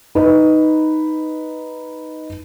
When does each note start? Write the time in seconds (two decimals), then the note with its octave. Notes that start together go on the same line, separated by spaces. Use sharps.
0.15 D#4 B4